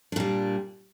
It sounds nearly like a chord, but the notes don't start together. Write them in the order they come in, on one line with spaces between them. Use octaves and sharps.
D4 A#2 G3